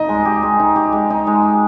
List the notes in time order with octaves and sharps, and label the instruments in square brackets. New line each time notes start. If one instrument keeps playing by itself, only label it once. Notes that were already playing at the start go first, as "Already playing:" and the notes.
Already playing: [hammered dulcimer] D#4 [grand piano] D#5
[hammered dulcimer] G#3
G4
G#3
D#4
G4
G#3
D#4
G#3
G4